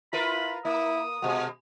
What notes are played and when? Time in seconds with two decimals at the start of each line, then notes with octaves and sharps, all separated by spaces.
0.13 E4 F4 A#4 B4 B5
0.65 A#3 E4 D#6
1.22 B2 G#3 F#4